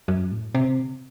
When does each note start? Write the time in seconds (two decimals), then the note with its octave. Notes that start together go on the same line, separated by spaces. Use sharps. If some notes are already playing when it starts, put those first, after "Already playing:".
0.08 F#2
0.32 A2
0.55 C3